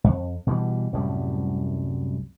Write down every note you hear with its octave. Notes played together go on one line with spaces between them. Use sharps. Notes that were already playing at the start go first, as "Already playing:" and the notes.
F2
B2 E3 G3
C2 F#2 A2 G3